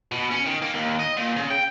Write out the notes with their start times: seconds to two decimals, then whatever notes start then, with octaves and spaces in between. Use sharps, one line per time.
0.12 B2
0.31 C#4
0.46 D#3
0.62 A#3
0.74 D#2
1.00 D#5
1.17 A#2
1.36 C#3
1.51 G5